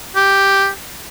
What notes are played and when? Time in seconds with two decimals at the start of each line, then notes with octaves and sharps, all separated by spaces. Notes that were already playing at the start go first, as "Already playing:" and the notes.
0.16 G4